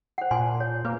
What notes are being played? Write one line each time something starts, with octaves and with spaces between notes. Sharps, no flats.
C5 F#5
A#2 G#5 A5 C6
C#5
A#3 B4